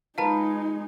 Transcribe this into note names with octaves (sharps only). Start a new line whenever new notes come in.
G#3 D#4 F4 B4 F5 A5 A#5